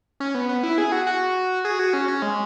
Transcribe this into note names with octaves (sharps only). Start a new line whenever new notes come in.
C#4
B3
B3
E4
G#4
F#4
F#4
G#4
F#4
C#4
C#4
G#3